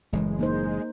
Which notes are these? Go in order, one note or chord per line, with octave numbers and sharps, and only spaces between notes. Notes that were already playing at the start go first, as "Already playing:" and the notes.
F#1 A2 E3 G#3
A#3 D#4 C5